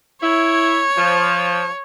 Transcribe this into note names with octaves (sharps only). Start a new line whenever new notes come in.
E4 C#5
F3